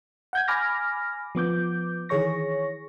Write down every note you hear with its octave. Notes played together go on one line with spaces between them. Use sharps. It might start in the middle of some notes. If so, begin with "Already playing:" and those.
F#5 G6 G#6
G#5 B5 D6 F6 A#6
F3 B3 D6 G6
D#3 E3 G#4 C#5 C#6 A#6